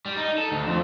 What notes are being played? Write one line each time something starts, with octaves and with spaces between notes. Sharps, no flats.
G3
D#4
A4
D2
F2